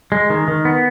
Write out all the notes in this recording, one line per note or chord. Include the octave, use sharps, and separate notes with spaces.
G#3
D#3
D#3
B3